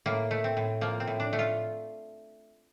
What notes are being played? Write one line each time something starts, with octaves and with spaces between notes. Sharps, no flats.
A2 A#3
A3
C4
A2
F3 A#3
C4
A2
D4
A3
F4